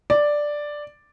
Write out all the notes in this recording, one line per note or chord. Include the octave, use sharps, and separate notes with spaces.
D5